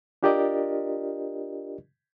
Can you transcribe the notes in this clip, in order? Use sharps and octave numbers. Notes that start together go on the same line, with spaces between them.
D4 F4 G4 A#4 D5 D#5